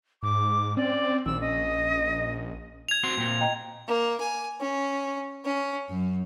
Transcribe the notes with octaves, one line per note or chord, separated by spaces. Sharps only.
G#2 D6
C4 C#4 D5
A#1 D#3 F#3 C4 E6
C#4 D#5
G#6 F7
C4 F#4 C6
A#2 C4
D#5 G5 A#5
A#3
G#5
C#4
C#4
F#2